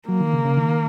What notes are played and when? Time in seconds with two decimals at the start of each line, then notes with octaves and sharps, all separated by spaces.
0.08 F#3 A#3
0.20 D#3
0.33 C#3
0.45 C#3
0.57 D#3